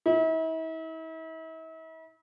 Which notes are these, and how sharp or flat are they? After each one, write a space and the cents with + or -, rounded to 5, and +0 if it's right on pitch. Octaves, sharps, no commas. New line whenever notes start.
E4 -40